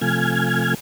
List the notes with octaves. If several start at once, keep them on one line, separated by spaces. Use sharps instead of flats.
C3 F3 A3 G#5 F6 G#6